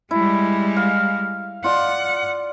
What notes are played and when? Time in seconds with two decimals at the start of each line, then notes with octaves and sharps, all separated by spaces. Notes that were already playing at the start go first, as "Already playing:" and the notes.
0.11 G3 G#3 E4
0.76 F5
1.64 F4 D5 F#5